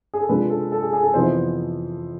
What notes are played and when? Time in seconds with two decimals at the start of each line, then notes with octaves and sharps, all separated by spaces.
0.14 G#4
0.20 A4
0.29 C3 G#3 D4 F4 B4
0.50 A4
0.72 A4
0.82 G#4
0.93 G#4
1.03 A4
1.14 F2 C3 E3 B3 E4 C5